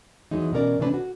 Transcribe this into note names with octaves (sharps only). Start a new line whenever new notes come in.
E2 E3 F#3 G#3 D#4
B2 E3 C#4 A#4 C#5 D5
C3 E3 A3 C#4 D4 B4
F#4